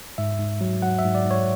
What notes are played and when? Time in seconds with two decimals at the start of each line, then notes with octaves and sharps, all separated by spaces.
0.18 G#2 E5
0.39 G#2
0.61 F#3
0.82 F#3 F#5
0.99 E5
1.04 G#2
1.15 D5
1.25 G#2
1.31 C#5